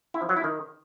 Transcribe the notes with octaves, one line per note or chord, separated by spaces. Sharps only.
E4
F3
F#3
E4
D#3